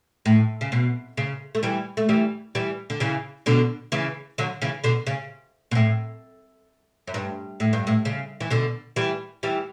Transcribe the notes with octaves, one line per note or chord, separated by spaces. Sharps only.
A2
C#3
B2
C#3
A3
E3 G3
A3
E3 G3
E3 G3
D3
C#3 E3
B2 D3
C#3 E3
D3 F#3
C#3 E3
B2 D3
C#3
B2
A2
F#2
G2
A2
G2
A2
C#3
E3
B2 D3
E3 G3
E3 G3